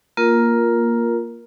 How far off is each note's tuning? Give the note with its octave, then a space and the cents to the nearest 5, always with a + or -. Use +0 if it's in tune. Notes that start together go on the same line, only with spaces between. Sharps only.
A#3 +5 F4 +5 A#4 +10